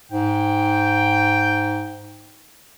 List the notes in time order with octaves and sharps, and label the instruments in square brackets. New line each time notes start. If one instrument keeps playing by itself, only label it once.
[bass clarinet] G#2 [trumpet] G5